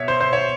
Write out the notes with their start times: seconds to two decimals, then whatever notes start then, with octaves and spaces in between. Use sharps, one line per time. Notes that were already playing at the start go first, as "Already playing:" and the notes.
Already playing: B2 C#5 E5
0.08 C5
0.21 C5
0.33 C#5